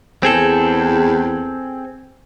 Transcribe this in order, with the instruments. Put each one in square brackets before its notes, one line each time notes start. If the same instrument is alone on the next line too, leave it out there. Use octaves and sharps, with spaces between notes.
[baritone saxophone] E2 [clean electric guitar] C4 G#4 A4